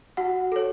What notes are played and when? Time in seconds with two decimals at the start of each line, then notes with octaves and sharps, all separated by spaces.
0.17 F#4 F#5
0.52 A4 C#5